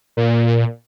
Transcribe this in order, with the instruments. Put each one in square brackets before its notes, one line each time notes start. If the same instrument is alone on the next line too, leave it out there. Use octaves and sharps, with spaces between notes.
[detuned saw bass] A#2